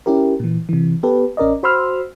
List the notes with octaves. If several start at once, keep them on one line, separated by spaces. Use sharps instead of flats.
C#4 E4 G4 A#4
A#2 E3
C3 E3
B3 G4 A4 B4
A1 C#4 A#4 D5 D#5
F#4 C5 B5 C6 E6 F6